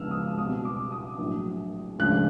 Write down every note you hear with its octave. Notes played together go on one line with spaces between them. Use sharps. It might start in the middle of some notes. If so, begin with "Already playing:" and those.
Already playing: C#2 C#3 F3 G#3 B3 E6 F6
D#6
C2 B2 G3 B3 D#6
D6
D#6
A#1 A2 F#3
E1 D2 C#3 F3 F#6